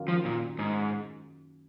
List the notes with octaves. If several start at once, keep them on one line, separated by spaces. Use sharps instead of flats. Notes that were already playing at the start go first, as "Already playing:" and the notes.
Already playing: F#2 D#3 A#3 F4
F3
A#2
G#2